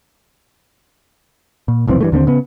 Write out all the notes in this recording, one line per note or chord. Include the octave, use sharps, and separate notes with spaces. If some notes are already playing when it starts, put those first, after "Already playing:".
A#2
F1 B1 E3 C4
G2 E3 A3
D#2 D3 A#3 C4
C#3 B3